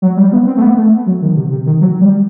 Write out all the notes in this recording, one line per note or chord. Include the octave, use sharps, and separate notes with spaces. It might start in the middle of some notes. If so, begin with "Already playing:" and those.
F#3
G3
B3
C4
A3
B3
A3
F#3
D#3
C3
C3
D#3
F#3
G3